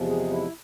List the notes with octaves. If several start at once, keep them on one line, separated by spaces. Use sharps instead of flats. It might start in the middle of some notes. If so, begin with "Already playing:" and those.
Already playing: E2 C3 F3 G#3
G#4
E4